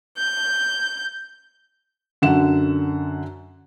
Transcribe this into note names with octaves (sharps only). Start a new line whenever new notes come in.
G6
F#2 D3 F#5 E7